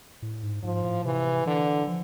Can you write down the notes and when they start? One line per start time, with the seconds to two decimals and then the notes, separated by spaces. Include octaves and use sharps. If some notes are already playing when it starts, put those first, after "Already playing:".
0.22 A2
0.43 G#2
0.63 G#2 F3
0.84 A2
1.05 C3 E3
1.46 D3 E3
1.87 F3